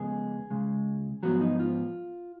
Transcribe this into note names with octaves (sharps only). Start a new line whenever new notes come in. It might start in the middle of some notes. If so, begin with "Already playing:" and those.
Already playing: F2 C#3 G#3 B3 G#4
C#2 C#3 G#3
G#2 F3 F#3 B3 F#4
D#4
F4